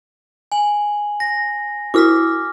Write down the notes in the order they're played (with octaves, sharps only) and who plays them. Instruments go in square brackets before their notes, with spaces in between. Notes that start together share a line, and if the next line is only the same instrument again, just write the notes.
[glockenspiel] G#5 F#7
A#6
[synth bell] E4 F#4 [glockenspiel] D6 F6 B6